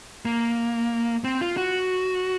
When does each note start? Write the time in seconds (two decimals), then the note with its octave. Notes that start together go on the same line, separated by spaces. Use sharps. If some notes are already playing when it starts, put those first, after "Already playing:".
0.25 A#3
1.24 C4
1.41 F4
1.57 F#4